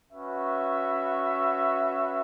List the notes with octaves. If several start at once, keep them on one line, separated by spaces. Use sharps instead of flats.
C#4 F#4 B4 E5